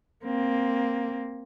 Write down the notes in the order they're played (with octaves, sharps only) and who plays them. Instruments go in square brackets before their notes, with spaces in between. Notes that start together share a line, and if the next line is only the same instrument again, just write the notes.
[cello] A#3 C4